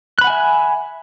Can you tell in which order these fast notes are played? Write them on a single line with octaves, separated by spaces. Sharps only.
F#6 B5 F#5 G#5 E5